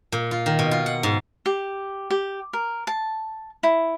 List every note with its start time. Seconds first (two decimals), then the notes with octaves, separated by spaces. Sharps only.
0.12 A#2
0.31 F4
0.46 D#3
0.59 B2
0.71 F4
0.86 F#5
1.03 G#2
1.46 G4
2.10 G4
2.53 A#4
2.87 A5
3.63 E4